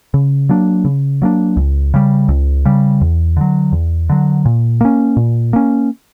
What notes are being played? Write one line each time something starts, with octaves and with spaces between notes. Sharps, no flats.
C#3
F#3 A#3 D4
C#3
F#3 A#3 D4
C#2
C#3 G3
C#2
C#3 G3
E2
D3 F#3
E2
D3 F#3
A#2
A#3 C#4
A#2
A#3 C#4